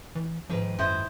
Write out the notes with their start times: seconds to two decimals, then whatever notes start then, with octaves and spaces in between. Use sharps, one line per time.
0.15 E3
0.50 G#2 D#3 F3 B4
0.79 F#2 E4 C5 D#5